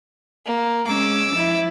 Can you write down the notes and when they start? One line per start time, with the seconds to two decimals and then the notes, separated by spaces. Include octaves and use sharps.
0.46 A#3
0.87 G#3 C#4 D6 E6
1.32 F3 E4